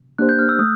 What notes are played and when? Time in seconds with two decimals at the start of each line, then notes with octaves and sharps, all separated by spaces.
0.18 A#3 D4 G4 C5 F#6
0.29 G6
0.39 F6
0.49 E6
0.59 A3 D#6